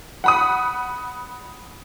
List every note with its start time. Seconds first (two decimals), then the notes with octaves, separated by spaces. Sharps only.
0.24 F#5 B5 D#6